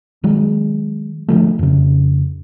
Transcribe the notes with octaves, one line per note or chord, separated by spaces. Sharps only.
D#3 F#3 G#3
D3 E3 F3 A3
F2 C#3